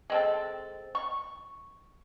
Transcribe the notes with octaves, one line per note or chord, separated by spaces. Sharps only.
G#3 C4 A4
C#6